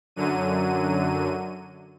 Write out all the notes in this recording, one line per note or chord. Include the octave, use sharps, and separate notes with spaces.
F#2 D3 F#3 D#7